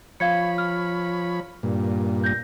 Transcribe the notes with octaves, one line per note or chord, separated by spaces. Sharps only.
F3 C#5 F5 B5 G#6 C#7
F6
G2 A#2
G6 A#6